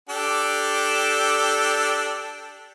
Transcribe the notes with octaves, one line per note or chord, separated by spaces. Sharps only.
D4 G4 A4